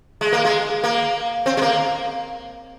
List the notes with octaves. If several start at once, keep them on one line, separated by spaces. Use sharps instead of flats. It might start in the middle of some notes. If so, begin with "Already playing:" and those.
G#3
A#3
G#3
A#3
C4
G#3
A#3